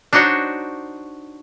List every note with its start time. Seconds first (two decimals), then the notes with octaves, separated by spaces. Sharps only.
0.13 D4 D#4 F#4 C5 C#5